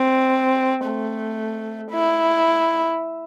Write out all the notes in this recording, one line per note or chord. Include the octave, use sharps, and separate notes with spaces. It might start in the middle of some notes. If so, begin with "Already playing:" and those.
Already playing: C4
A3
E4